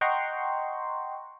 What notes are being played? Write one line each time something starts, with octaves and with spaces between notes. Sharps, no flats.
D#5 F#5 G5 A#5 C6 C#6